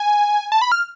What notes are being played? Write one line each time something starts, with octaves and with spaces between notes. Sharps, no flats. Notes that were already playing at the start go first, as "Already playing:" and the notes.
Already playing: G#5
A5
B5
F6